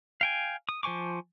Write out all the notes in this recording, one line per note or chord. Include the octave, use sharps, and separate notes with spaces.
F5 G5 G#5
D#6
F3 C5 G#5 C#6 D6